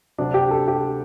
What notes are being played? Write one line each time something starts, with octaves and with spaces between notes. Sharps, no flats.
D2 C3 F#3 D4
G4
A4
G4